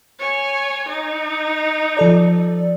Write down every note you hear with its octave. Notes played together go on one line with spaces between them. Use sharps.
C#5 G#5
D#4
F3 A4 D5